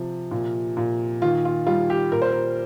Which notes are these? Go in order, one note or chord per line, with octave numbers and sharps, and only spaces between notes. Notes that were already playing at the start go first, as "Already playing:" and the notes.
Already playing: C3 F3
A#2
A#2
D#3 F4
F4
G3 F4
G4
A#2 A#4
C5
A#4